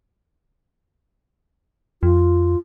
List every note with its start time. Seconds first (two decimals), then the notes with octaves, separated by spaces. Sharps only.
2.03 F2 F4